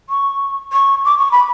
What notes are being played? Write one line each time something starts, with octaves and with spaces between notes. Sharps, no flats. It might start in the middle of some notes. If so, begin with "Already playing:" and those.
C#6
C#6
D6
C#6
B5